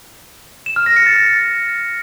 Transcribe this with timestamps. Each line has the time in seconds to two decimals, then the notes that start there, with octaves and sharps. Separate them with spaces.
0.66 E7
0.76 F6
0.86 A#6
0.96 C#7
1.06 A6